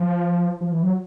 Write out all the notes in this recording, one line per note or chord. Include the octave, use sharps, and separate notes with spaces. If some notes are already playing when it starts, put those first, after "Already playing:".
Already playing: F3
F3
E3
F#3